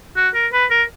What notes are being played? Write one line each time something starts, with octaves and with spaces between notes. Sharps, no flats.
F#4
A#4
B4
A#4